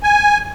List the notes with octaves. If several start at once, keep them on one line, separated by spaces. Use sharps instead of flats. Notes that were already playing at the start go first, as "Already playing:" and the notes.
G#5